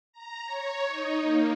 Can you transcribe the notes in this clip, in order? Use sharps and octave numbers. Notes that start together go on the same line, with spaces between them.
A#5
C#5
D#4
A#3